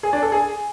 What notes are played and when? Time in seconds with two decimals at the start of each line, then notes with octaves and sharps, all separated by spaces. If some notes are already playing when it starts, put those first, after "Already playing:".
0.03 G#4
0.13 D4
0.22 A4
0.32 G#4